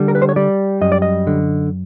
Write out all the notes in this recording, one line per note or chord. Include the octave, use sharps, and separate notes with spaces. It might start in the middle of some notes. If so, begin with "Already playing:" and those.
Already playing: D3 G3
A#4
B4
C5
C#5
G3 D5
F#2 D#5
D5
D#5
D3